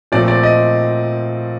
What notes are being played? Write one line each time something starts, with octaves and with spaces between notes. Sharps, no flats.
A#2 F3 A3 C4 D5
D5
D#5